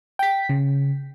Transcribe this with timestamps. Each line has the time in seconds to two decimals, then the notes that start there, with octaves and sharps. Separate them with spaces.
0.19 G5 B6
0.49 C#3